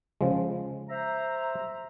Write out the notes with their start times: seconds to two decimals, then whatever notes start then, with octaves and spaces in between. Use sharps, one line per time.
0.21 C#3 F3 G#3
0.89 C5 E5 A#5